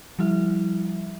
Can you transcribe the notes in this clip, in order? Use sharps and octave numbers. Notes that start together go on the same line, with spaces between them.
F3 G3 E4 E5